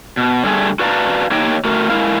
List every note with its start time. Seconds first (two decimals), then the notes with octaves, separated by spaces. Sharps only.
0.17 B2
0.44 D3 G3 A3 G#4
0.79 F#4 B4 D5 F5 A5 A#5
1.31 A#3 D#4 G4 C#5 D#5 G5
1.65 A3 F#4 A#4
1.90 G#3 E4 A#4 F5